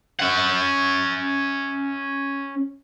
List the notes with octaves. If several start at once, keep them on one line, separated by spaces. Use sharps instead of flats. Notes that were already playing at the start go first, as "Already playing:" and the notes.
C#4 F#5